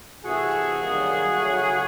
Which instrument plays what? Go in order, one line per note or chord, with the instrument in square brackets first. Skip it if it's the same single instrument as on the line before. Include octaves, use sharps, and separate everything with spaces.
[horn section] C3 E3 A3 F#4 G#4
F#2 D#3 G3 A#3
C#3 F#3 A3